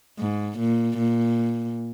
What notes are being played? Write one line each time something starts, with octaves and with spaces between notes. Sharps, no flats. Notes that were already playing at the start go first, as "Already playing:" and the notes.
G#2
A#2
A#2